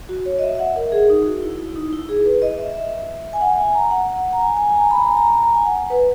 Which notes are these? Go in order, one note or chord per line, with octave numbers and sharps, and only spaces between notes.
F#4
C#5
D#5
E5
E5
F#5
A#4
G#4
D#4
F#4
E4
E4
D#4
E4
G#4
B4
D#5
E5
E5
G#5
F#5
G#5
A#5
F#5
A#5
G#5
G#5
G#5
A#5
B5
A#5
G#5
A#5
A#5
G#5
F#5
B4